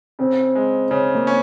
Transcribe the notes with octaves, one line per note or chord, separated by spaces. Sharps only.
C#3 C4
G#3
C#3 C#4
A#3
C#4